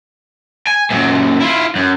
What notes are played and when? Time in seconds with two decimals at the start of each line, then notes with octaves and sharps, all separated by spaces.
0.67 G#5
0.90 F#2 A#2
1.40 E4 F4
1.76 F#2